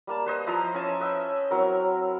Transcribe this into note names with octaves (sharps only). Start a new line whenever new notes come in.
G3 A#3 A5
B4 C5 D#5
F3 E4 D#5 A#5
C#4 G#5 A5
B4 D#5 E5 G5
F#3 C4 E4 A#4